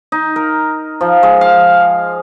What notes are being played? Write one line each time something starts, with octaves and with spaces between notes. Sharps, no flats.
D#4
A#4
F3
G#3
F5